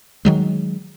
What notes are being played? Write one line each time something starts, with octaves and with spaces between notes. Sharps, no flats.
D#3 F#3 G#3